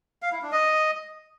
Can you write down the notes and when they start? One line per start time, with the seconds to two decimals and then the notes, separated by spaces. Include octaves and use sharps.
0.22 F5
0.32 E4
0.42 D4
0.52 D#5